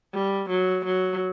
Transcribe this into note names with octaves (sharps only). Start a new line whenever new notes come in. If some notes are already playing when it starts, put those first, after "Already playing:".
G3
F#3
F#3